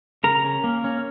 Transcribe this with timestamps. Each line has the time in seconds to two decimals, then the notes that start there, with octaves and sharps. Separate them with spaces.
0.24 C#3 A#4 A#5
0.44 C#4
0.64 A#3
0.84 C#4